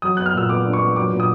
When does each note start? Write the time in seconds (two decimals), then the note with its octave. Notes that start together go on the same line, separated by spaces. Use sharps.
0.02 F#3 D#6
0.17 B3 F#6
0.26 F6
0.34 A#2 E6
0.49 B3 D6
0.65 D4
0.73 C#6
0.81 B3
0.96 F#3 D6
1.12 A#2
1.20 D#6